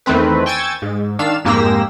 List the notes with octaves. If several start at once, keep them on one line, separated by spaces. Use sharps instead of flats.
E2 D#3 A3 C4 B4
G5 G#5 C#6 E6 G#6 A6
G#2
D#3 D4 F5 E6 E7
F2 G#2 A#3 G4 E6 A#6